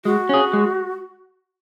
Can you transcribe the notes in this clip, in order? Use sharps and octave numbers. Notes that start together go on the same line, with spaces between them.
G#3 F#4
C#4 G#4
G#3